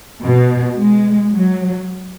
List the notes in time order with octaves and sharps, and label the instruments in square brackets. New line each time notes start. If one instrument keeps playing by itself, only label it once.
[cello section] B2
G#3
F#3